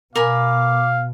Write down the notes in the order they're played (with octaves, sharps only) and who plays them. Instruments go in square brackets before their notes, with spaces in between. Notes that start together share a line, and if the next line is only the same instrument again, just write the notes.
[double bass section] B2 [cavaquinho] A#4 G#5 B5 [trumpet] F5 [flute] D6